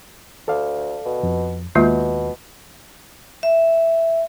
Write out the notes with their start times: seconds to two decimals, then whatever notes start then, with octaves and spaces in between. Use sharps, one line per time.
0.48 D2 A4 D5 F5
1.05 B2
1.23 F2
1.75 D#2 B2 G#3 A#3 F4
3.43 E5